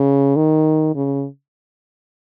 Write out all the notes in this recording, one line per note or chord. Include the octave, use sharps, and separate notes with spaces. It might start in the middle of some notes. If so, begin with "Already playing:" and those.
Already playing: C#3
D#3
C#3